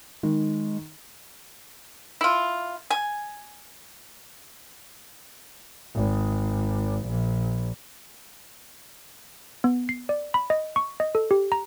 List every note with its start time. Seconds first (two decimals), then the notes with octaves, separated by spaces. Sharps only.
0.23 D#3 G#3
2.21 E4 F4
2.90 G#5
5.95 G#1
7.06 A#1
9.64 B3
9.89 C7
10.09 D5
10.34 B5
10.50 D#5
10.76 C#6
11.00 D#5
11.15 A4
11.31 G4
11.52 A#5